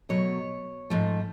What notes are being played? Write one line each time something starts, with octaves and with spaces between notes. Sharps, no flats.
B2 F#3 A3 C#5
G#2 F3 A3